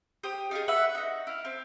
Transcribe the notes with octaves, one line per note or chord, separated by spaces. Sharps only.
G4 C5 G5 D#6
D#4 F4 G4 G#4
F#4 B4 E5 F#5
D#4 F#4
E4 F5
C4